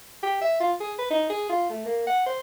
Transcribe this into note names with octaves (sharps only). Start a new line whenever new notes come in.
G4
E5
F4
G#4
B4
D#4
G#4
F4
A3
A#3
F#5
C5